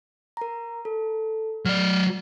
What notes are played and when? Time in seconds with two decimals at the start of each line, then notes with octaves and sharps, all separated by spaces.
0.37 A#4 A#5
0.85 A4
1.66 F#3 D5 F6